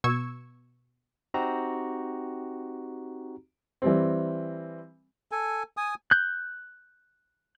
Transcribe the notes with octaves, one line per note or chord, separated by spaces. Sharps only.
B2 C#6 E6 G#6
C4 D#4 F#4 G4 A#5
E3 G3 C4
A4 G#5
G#5 D#6
F#6 G6